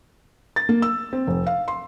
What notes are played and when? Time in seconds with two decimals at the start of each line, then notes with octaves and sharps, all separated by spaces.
0.56 A6
0.69 A#3
0.82 E6
1.13 C4
1.27 F1
1.46 F5
1.68 C6